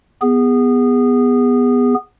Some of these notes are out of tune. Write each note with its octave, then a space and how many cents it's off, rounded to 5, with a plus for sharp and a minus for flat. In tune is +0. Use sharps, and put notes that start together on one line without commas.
B3 +0 G#4 -25